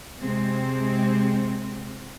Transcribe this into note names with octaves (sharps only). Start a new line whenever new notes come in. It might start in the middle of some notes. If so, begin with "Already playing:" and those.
C3 G#3 C4